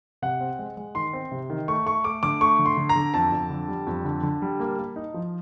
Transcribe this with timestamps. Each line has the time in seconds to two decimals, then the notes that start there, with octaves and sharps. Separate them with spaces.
0.22 C3 F#5
0.40 C4
0.59 G#3
0.77 G#3
0.95 D#3 C6
1.13 C4
1.31 C3
1.50 D#3
1.68 A3 C#6
1.86 A3 C#6
2.04 A3 D6
2.23 D3 D6
2.41 A3 C#6
2.59 D3
2.66 C6
2.77 D3
2.89 A#5
2.96 D3
3.14 F2 A5
3.32 F2
3.50 D3
3.68 G3
3.87 F2
4.05 D3
4.23 D3
4.42 G3
4.60 A#3
4.78 A#3
4.96 D#4
5.14 F3